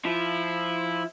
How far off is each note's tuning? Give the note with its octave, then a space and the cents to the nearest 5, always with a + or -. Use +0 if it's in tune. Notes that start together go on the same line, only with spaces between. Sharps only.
F3 -15 E4 -5